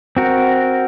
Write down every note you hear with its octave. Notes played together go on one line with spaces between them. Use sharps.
C4 F#4 A#4